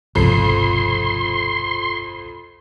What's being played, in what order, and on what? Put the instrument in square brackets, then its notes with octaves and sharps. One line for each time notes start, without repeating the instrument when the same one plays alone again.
[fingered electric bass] G1 C2 B2 [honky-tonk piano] F2 [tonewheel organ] C6